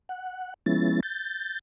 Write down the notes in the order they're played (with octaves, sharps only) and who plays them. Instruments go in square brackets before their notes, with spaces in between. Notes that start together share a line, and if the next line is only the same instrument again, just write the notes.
[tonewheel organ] F#5
F3 G#3 B3 C#4 E4 A6
G6 A6